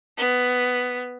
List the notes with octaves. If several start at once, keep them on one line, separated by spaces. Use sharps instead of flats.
B3